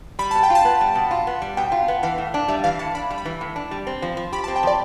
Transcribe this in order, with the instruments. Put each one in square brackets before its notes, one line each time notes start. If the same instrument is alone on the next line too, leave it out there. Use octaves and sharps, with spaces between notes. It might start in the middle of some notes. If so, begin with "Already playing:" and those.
[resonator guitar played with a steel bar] G3 [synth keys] B5
[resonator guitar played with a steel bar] B2 [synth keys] A5
[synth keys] G5
[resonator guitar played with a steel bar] F4
[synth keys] A5
[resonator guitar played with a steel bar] B3
G3
B2
F4
B3
G3
[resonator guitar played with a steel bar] B2 [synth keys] G5
[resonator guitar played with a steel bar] F4
B3
[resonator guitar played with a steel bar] E3 [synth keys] F5
[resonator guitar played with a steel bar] A2
D4
[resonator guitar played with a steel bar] G3 [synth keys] E5
[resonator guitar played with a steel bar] E3 [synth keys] F5
[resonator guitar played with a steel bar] A2 [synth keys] A5
[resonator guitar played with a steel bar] D4 [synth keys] B5
[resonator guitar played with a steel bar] G3
[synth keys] B5
[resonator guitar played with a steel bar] E3
A2
D4
G3
C4
F3
F3
[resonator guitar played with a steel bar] G4 [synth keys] B5
[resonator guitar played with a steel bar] C4 [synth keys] A5
[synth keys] G5
[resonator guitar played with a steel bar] F3 [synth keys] D5